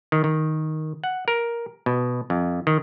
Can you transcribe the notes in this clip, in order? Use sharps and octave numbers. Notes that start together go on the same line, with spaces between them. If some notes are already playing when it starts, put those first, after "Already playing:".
D#3
D#3
F#5
A#4
B2
F2
D#3